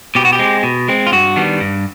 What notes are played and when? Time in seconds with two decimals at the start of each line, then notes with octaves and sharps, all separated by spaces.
0.15 B2 G4
0.25 F#4
0.33 G4
0.39 G#3 C4
0.63 B2
0.88 G#3 C4
1.07 F4
1.12 G2 F#4
1.36 D#3 G3 B3 D4
1.60 G2